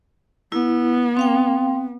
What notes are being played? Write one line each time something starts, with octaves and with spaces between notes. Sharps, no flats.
B3 E4
C4 F5 G5